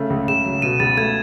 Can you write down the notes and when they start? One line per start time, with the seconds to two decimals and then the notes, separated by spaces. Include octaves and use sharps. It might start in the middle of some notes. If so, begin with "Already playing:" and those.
Already playing: C#3 A3
0.10 C#2
0.28 C#2 E7
0.45 F#3
0.62 B2 D#7
0.80 C#2 A6
0.97 A3 G#6